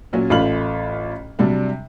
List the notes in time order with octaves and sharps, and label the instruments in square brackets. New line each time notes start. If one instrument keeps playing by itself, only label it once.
[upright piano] A#2 F#3 C#4
A1 A3 F4 B5 F6 F#7
C3 F#3 G3 D4